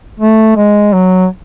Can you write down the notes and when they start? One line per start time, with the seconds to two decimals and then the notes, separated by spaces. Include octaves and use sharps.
0.20 A3
0.57 G#3
0.93 F#3